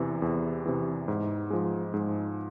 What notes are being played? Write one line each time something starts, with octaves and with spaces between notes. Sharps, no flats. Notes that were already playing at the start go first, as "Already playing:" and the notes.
Already playing: E2 C3 E3
E2
C3 E3
G#2
F3 G#3
G#2